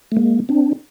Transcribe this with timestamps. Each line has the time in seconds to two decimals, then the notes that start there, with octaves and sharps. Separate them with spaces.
0.12 A3
0.17 G#3 A#3
0.49 C4 D4